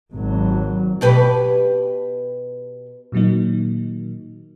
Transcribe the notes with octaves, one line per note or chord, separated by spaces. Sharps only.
G#1 F#3
B2 G4 B4
A#2 D#3 F#3 A#3 D#4